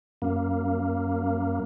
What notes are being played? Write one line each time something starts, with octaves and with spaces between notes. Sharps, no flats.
F#2 A#3